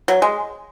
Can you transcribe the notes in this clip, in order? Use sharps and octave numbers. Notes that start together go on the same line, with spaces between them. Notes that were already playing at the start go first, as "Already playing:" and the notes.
F#3
G#3